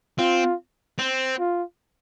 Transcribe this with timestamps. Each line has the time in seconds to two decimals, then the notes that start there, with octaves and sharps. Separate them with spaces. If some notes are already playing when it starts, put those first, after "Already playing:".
0.19 C4 F4
0.99 C4
1.39 F4